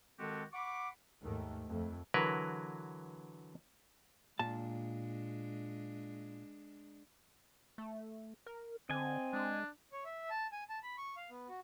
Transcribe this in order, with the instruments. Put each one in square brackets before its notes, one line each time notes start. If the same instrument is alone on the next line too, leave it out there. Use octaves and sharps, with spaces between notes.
[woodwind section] D#3 G#3 C4 F#4 G4 A4
F#5 B5 C#6 D6
[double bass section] D#2 G#2 D#3 A3
F2 A3
[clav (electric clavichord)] D3 E3 F#3 A#4 B4
[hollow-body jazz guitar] A#2 A5 [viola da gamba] G#3 D4
[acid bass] A3
A#4
[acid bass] D3 [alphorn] C4 [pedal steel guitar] D#5 G#5
[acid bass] G#3 [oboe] D4
[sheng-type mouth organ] C#5
E5
A5
G#5
A5
B5
C#6
F5
B3
F#4